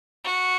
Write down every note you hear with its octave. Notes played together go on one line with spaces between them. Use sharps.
F#4